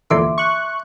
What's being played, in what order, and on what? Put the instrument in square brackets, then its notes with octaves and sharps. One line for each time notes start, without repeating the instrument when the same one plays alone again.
[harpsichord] E2 A#2 D3 [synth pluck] E5 C6 D6
[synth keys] C#6 F#6